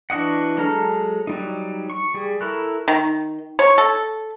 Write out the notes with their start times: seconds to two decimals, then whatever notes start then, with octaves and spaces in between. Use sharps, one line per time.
0.10 E3 D4 F#4 D#5 F#5
0.57 F#3 G#3 A4 A#5 F6
1.27 F#3 G3 D#4
1.90 C#6
2.14 G3 G#4
2.41 E4 A4 A#4 C#6 F#6
2.88 D#3
3.59 C#5
3.78 A4